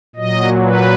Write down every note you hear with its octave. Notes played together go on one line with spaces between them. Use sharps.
A#2 F#3 D#5
B4